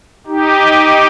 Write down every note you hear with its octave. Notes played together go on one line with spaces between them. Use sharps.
D#4 G4